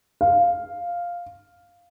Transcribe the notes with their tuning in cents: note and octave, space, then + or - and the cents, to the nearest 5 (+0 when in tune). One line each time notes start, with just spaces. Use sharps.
F5 +0